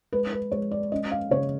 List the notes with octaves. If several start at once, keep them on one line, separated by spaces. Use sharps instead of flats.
G#3 B4
B4
G#3 C#5
D5
C#4 D#5
F5
C#3 C#5